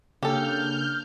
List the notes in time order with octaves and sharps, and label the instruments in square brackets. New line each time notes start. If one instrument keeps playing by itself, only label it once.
[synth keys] C#3 A#3 [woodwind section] D4 [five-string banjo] G4 A4 [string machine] F6 G6